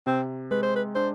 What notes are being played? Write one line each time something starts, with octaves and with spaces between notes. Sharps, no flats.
C3 C4
G#3 B4
C5
B4
D4 C5